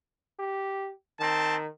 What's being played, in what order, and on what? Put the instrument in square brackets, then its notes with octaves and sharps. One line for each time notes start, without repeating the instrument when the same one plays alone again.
[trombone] G4
[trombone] D#3 [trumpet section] C4 A5